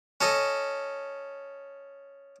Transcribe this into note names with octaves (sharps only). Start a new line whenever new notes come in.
C#4 A4 D#5